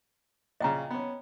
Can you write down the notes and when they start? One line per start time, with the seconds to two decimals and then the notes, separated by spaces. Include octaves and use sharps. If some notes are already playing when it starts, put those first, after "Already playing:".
0.61 A#1 C#3 D#5 G5 A#5
0.90 B3 C#4